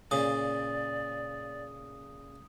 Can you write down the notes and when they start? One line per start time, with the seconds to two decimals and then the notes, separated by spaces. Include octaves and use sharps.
0.11 A#2 C#3 D5 D#6